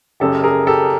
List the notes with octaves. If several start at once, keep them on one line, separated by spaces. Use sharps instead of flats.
F#1 F#2 C#3 G4 A4
G#4 A#4
G4 A4